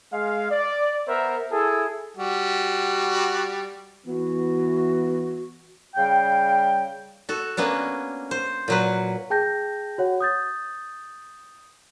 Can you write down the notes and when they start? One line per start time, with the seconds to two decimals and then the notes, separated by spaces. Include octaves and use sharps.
0.13 G#3 F5
0.50 D5
1.07 B3 A#4 C5 E5
1.51 E4 G#4 A4
2.17 G3 F#4
4.06 E3 B3 F#4
5.95 C#3 G3 F5 G5
7.29 F#4 A4
7.57 A#3 B3 C#4 D4
8.31 C5
8.68 A#2 F#3 B4
9.30 G#4 G5 A5 G6 A#6
9.98 F#4 C#5 F#5
10.21 D#6 G6 A6